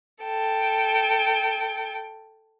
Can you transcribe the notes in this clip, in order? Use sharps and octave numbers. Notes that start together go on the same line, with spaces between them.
A4 G5